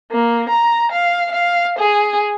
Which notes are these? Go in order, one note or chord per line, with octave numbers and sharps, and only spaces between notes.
A#3
A#5
F5
F5
G#4